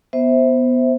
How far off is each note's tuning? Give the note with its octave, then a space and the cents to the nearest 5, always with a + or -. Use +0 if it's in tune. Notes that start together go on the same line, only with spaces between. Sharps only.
B3 +0 C5 +0 E5 -10